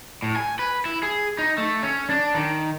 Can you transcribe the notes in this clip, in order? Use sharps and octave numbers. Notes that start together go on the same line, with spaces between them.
A2
G#5
B4
E4
G#4
D#4
A3
C#4
D4
D#3